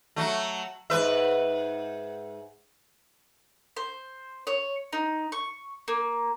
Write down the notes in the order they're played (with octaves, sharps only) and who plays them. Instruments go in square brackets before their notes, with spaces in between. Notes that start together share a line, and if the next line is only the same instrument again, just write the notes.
[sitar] F#3 A3
G#2 B4 E5
[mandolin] C5
C#5
D#4
C#6
A#3